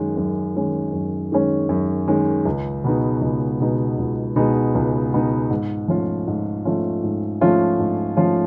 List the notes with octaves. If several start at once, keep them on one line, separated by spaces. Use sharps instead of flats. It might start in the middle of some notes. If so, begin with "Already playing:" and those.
Already playing: F#2 D#3 G#3 C#4
F#2
D#3 G#3 C#4
F#2
D#3 G#3 C#4
F#2
D#3 G#3 C#4
C#2
B2 G#3 B3 D#4
C#2
B2 G#3 B3 D#4
C#2
B2 G#3 B3 D#4
C#2
B2 G#3 B3 D#4
G#2
F3 A3 C#4 F4
G#2
F3 A3 C#4 F4
G#2
F3 A3 C#4 F4
G#2
F3 A3 C#4 F4